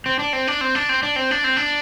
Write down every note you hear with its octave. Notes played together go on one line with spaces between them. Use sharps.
C4
D4
C4
D4
C4
D4
C4
D4
C4
D4
C4
D4